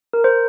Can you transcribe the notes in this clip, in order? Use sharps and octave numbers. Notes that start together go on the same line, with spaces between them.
A#4
C5